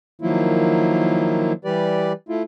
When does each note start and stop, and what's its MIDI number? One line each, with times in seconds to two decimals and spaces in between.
0.22 1.53 51
0.22 1.53 53
0.22 1.53 54
0.22 1.53 58
0.22 1.53 64
0.22 1.53 65
1.65 2.13 52
1.65 2.13 55
1.65 2.13 67
1.65 2.13 71
1.65 2.13 74
2.29 2.43 57
2.29 2.43 64
2.29 2.43 65